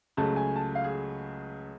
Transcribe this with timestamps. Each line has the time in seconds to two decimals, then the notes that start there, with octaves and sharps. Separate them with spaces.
0.17 C#2 C#3 F#3 A3 A5
0.36 G#5
0.56 A5
0.75 F5
0.84 G#4